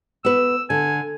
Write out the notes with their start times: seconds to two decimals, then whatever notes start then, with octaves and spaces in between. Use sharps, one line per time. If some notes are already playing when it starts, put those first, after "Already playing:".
0.25 B3 B4 E6
0.70 D3 G#5